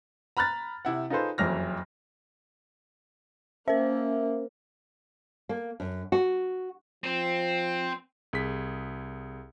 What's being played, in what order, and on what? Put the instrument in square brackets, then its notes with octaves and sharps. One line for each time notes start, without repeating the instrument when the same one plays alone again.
[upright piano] A#5 B5 F6 F#6 A6
C3 E4 F#5
D#4 F4 G#4 A4 B4 C5
F#1 F2 E3 F#3 F6 A#6
[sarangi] A#3 [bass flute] C#4 [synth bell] A#4 C5 [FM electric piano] E5
[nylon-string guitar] A#3
F#2
F#4
[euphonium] F3 [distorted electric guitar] C4
[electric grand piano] C2 G#4 B6